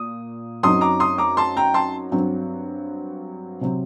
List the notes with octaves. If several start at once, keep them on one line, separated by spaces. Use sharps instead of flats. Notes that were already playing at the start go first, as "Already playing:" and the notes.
Already playing: A#2 A#3 D#6
F#2 F#3 C4 D#4 C6 D#6
A#5 D6
C6 D#6
A#5 D6
A5 C6
G5 A#5
A5 C6
G2 F#3 C4
C3 F#3 C4